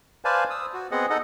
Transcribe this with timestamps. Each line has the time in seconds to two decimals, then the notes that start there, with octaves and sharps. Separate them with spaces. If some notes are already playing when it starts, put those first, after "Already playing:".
0.25 B4 C5 D5 F5 G#5 A5
0.50 D#6 E6
0.74 F#4
0.91 B3 C4 G#4 D#5 F#5
1.10 D#4 A4 D#5 F#5